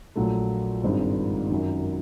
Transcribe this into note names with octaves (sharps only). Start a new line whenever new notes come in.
A#1 A#2 F#3 A3
G#1 G2 D#3 G#3 C4
F#2 D#3 F#3